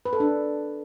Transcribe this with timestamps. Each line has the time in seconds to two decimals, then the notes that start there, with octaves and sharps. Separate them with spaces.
0.05 B4
0.13 A4
0.20 D4